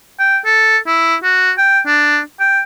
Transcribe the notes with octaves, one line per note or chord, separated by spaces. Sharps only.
G5
A4
E4
F#4
G5
D4
G5